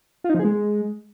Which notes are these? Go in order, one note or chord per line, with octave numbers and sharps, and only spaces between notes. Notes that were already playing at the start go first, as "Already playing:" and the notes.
F4
D#4
F3
G#4
G#3